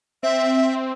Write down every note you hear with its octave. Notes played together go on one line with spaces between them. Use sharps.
C4 E5